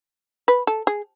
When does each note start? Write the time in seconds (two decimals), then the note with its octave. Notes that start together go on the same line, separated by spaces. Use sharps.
0.48 B4
0.67 A4
0.87 G#4